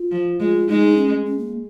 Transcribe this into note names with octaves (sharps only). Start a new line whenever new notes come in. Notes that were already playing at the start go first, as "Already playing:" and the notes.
Already playing: F4
F3
G#3 F4
G#3 D#4
C#4
C#4
A#3